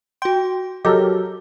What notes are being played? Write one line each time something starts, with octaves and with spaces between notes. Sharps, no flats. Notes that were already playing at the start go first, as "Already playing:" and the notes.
F#4 G5 C6
F#3 G4 A4 A#4 D#5